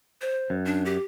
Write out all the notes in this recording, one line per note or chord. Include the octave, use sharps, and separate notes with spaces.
C5
F#2
D4
G4